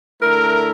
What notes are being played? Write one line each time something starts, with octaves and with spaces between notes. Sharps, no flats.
D3 A3 E4 A#4